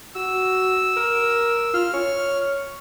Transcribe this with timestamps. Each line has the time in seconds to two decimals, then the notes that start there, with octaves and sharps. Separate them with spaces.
0.15 F#4 E6
0.96 A#4
1.74 F4 F6
1.93 C#5